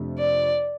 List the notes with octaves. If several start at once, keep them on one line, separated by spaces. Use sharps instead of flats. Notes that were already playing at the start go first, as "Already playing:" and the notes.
Already playing: F2 C3 A3 D4
D5